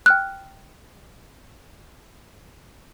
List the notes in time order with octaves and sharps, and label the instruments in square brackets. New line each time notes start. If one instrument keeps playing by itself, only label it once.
[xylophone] G5 F6 F#6